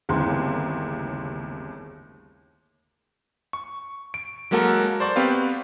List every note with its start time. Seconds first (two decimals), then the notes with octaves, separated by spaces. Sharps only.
0.09 G1 D#2 A2 C#3 C4 C6
3.53 C#6
4.14 D7
4.51 F#3 G#3 A#3 F#4 A4 A#4
5.00 C5 D5 C#6
5.16 B3 C4 G4 B4 F5